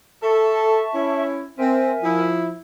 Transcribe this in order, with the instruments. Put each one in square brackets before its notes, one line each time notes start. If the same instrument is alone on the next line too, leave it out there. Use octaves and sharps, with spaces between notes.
[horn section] A4 [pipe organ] E5 A5 C#6
[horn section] C#4 E4
[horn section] C4 [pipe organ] A#4 E5 G#5
[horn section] F3 E4